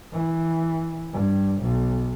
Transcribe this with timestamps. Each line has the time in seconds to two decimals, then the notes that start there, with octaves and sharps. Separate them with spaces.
0.13 E3
1.13 G2
1.62 B1